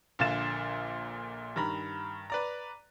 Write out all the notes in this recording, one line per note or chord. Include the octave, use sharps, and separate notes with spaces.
A#1 A#2 D3 F5 A6 E7
G2 D#3 A#5 B5
B4 D5 A#5